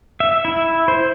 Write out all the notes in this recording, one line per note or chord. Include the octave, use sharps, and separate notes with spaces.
E5
E4
C5